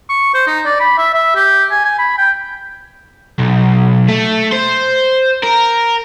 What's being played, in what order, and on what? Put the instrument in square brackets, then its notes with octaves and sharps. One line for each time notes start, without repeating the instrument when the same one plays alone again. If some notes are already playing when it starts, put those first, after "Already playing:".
[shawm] C#6
C5
D#4
D5
B5
E5
E5
G4
G#5
G#5
B5
G5
[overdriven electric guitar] B1
A3
C5
A#4